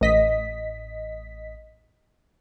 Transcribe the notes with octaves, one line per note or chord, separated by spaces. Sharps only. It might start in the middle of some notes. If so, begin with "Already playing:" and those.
A1 D#5 B6